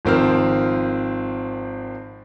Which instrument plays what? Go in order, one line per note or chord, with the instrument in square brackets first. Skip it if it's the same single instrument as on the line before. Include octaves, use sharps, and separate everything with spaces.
[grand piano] G#1 F3 C4 A#4 F6